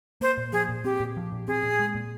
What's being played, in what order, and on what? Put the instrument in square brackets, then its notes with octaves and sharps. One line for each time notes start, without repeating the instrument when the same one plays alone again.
[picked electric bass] A#3 [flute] C5
[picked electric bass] A#2
[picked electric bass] F3 [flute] G#4
[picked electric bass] A#2
[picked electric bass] C4 [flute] G4
[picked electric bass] A#2
F3
A#2
[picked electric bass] C4 [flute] G#4
[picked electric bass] A#2
G#3
A#2